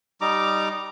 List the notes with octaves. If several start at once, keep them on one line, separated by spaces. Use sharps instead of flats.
G3 D#4 A#5 D6